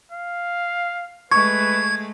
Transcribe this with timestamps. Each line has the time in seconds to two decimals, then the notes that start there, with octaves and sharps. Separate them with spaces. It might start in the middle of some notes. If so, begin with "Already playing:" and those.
0.12 F5
1.31 G#3 A3 B4 C#6 G#6